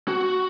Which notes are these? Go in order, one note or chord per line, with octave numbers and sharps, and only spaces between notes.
F#4